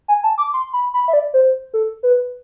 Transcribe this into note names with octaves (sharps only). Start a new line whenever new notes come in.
G#5
A5
D6
C6
B5
B5
E5
D5
C5
A4
B4